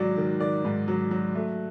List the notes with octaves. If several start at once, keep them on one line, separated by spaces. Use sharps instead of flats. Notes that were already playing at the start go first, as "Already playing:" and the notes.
Already playing: G#2 D#3 F#3 D5
D#3
D#3 D5
G#2
F#3
F#3
A3